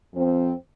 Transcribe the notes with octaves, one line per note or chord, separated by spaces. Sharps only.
F2 F3 C4